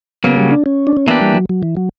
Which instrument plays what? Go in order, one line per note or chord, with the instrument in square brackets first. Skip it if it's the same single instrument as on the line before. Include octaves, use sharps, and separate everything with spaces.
[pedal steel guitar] C#3 F#3 A#3 [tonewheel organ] B3
[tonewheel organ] G3
D4
C#4
D4
C#4
[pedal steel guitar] E3 A#3 D4 G4 [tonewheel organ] B3
[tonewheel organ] G3
F#3
F#3
E3
F#3